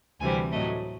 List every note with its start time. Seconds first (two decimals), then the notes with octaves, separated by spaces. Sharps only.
0.21 D2 C3 E3 G3 C4 G#5
0.52 A2 F#3 A3 D#5